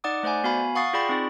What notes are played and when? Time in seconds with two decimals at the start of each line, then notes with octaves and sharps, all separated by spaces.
0.04 D#4 D5 F#5 D6 D#6
0.23 A3 C5 D5 F#5 G#5
0.44 B3 F#4 F5 G#5 B5
0.75 F5 F#5 C#6 D#6 A6 C7
0.93 F4 G#4 D5 G5 B5 C#6
1.09 C4 D#4 G#4